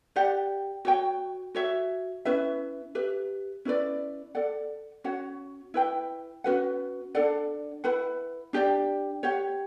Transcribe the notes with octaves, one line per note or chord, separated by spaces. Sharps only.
G4 D5 F#5
F#4 C#5 G5
F#4 C#5 E5
C#4 E4 B4 E5
G4 B4 E5
C#4 E4 B4 D5
A4 D5 F#5
C#4 F#4 C#5 F#5
E4 B4 D5 G5
C#4 F#4 B4 F#5
D4 A4 D5 F#5
E4 B4 F#5 B5
D4 G4 D5 G5
G4 C#5 F#5